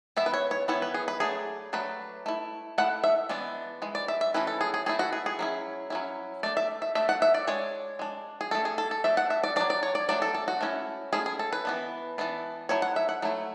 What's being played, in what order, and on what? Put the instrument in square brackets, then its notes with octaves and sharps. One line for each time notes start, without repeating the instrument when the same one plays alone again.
[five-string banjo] E3 B3 E4 E5
B4
C#5
C#5
E3 B3 E4 C#5
B4
G#4
B4
F#3 A3 D4 G#4
F#3 A3 D4 B4
A3 E4
A3 E4 F#5
E5
E3 G#3 B3 D4
E3 G#3
D5
E5
E5
E3 A3 C#4 E4 B4
A4
G#4
G#4
E3 A3 C#4 E4 G#4
F#4
G#4
G#4
F#3 C#4 E4
F#3 C#4 E4
A3 D4 D5
E5
E5
A3 D4 E5
F#5
E5
D5
G#3 D4 C#5
G#3 D4
G#4
A3 D4 A4
G#4
A4
A4
A3 D4 E5
F#5
E5
D5
F#3 A3 D4 D5
D5
C#5
D5
F#3 A3 D4 D5
A4
A4
F#4
A3 C#4 E4
A3 C#4 E4 G#4
G#4
A4
B4
E3 B3 D4
E3 B3 D4
F#3 A3 E4 C#5
F#5
E5
F#5
F#3 A3 E4